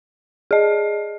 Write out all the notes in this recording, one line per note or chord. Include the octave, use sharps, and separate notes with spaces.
G#4 D#5